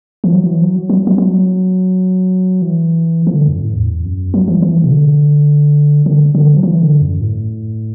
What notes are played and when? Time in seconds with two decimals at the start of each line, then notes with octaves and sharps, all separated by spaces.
0.24 E3
0.32 F#3
0.46 E3
0.61 F#3
0.90 F#3
1.07 F#3
1.18 F#3
2.62 E3
3.27 E3
3.34 D3
3.48 F#2
3.62 A2
3.76 E2
4.05 F#2
4.34 F#3
4.48 E3
4.62 E3
4.84 B2
4.91 D3
6.06 D3
6.35 D3
6.56 F#3
6.63 E3
6.82 D3
7.02 F#2
7.21 A2